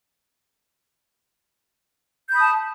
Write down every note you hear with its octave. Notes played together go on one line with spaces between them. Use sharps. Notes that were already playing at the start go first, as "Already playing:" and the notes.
A5 B5 D#6 G6